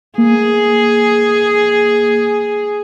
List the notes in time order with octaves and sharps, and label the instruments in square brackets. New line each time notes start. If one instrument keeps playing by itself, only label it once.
[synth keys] A#3 [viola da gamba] G#4